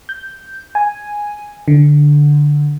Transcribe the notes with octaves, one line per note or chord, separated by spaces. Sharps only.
G6
G#5
D3